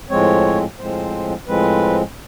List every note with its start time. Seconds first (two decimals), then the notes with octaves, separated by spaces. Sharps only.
0.10 A2 F3 G#3 C4 C#5
0.79 A2 F3 G#3 C4 C5
1.47 A2 F3 G#3 C4 B4